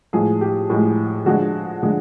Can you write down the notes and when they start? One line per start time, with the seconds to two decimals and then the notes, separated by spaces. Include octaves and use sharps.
0.13 A2 F3 G#3 G#4
0.41 G4
0.70 A2 F3 G#3
1.26 D3 F3 G#3 F#4
1.83 D3 F3 G#3